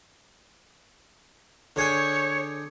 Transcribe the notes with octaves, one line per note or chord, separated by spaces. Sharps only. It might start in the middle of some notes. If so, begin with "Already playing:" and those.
D3 G#4 C#5 G5